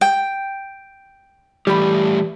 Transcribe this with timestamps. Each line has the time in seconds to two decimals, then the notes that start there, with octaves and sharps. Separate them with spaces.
0.01 G5
1.67 E3 G3 A3 G4 B5